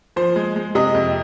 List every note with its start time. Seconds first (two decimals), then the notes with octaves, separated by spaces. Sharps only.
0.16 F3 C5
0.36 G#3
0.56 G#3
0.75 C3 D#5
0.95 F2